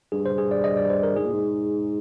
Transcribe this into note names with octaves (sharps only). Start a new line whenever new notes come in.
G2 G#4
C5
G#4
D5
D#5
D5
C5
A#4
G#2 G#4
A#2
G#2